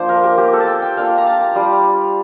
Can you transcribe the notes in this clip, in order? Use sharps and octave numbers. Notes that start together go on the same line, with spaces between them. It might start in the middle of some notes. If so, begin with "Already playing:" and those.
Already playing: F3 A#3 D4 C5
A#4
G4
A#3 F4 G4
A4
A5
G5
G5
A#3 D4 F4 F5
A#5
A5
A#5
G3 D4 F4